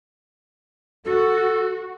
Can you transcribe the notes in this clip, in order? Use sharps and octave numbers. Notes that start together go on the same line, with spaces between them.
F#4 A4